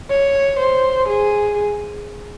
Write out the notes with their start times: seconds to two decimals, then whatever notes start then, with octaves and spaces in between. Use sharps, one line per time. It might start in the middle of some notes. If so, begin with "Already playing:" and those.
0.10 C#5
0.59 C5
1.09 G#4